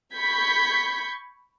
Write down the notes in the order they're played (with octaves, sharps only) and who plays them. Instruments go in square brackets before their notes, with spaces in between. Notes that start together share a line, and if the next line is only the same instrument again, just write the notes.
[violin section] B5 C#6 G6 G#6 B6